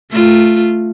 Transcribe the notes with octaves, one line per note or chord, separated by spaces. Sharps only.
A3 F4